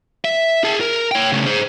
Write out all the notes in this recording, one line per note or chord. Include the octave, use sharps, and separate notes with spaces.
E5
G#4 A5
A#4
C#5 G5
C#3 A3
G#4 C5